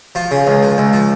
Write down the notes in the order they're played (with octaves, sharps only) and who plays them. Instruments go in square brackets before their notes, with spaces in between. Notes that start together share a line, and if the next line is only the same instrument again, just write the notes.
[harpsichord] F3 F4
C#3
C#2
F3
C#2
F3